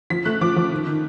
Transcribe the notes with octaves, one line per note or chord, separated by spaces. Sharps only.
F3 B6
A3 F#6
F3 D6
F3
D#3
D#3